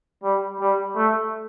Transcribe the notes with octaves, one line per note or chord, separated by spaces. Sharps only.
G3
G3
A3